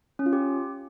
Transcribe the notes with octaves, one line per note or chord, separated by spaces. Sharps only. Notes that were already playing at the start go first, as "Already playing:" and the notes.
C#4
F4
G4